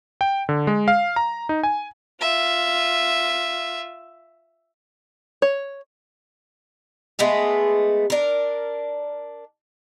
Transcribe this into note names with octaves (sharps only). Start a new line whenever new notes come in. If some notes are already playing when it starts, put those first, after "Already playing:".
G5
D3
G#3
F5
A#5
D#4
G#5
F4 E5
C#5
G#3 A3 B3 G#4
D4 A#4